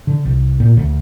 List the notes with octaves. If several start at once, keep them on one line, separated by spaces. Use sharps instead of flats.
D3
C2
A#2
D2